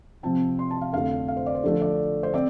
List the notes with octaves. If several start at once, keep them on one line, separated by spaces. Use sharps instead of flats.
C3 F3 C4 A5
C6
A5
F5
F2 D3 A3 F5
F5
C5
D5
C5
D3 F3 A3 D4
D5
C5
C4 D5